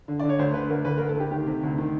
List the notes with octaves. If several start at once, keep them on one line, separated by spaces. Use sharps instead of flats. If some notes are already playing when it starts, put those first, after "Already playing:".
D3
D3 D5
C#5
D2 C5
D3 B4
D2 A#4
D2 B4
D2 A#4
A4
D2 G4
D#3 G4
C3
D2
D#3